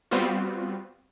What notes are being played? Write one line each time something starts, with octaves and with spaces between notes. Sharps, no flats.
G3 B3 C4 F4 F#4